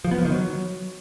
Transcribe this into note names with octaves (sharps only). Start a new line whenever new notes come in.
F3
B3
F3
D#3
F#3